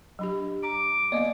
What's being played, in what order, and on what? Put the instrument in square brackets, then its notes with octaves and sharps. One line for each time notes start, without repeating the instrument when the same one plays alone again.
[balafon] F#3 D4 G4
[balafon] A#5 [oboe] D6
[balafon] A#3 B3 F5 [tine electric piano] D5 D#5